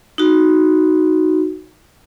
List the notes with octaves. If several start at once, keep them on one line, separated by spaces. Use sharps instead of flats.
D#4 F#4